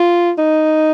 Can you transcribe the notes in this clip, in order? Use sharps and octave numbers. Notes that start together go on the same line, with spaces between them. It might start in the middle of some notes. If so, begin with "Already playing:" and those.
Already playing: F4
D#4